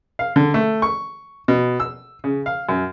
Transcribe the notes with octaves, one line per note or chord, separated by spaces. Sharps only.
F5
D3
A3
C#6
B2
E6
C#3
F5
F#2